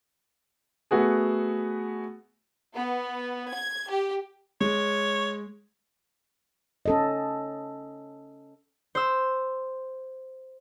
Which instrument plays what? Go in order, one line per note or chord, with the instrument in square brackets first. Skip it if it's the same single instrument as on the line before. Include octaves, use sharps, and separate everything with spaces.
[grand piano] A3 B3 F#4 G#4
[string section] B3
G#6
G4
[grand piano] G#3 [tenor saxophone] C#5
[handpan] C#4 A4 D#5
[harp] C5 E6